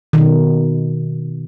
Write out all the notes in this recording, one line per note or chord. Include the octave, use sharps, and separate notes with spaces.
B2 D#3